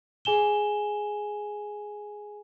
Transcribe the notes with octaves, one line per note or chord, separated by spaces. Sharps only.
G#4 G#5 E7 G7